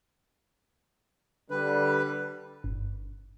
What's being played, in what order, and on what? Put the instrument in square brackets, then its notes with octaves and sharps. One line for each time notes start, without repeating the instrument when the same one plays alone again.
[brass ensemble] D3 G3 [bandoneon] B4
[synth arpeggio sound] G1